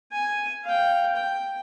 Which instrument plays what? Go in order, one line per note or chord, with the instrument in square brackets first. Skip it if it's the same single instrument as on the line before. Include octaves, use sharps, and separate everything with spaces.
[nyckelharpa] G#5
F5 G5
G5